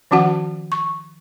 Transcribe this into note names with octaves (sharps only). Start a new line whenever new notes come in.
D#3 F3 C#4 F#4 F#5
C#6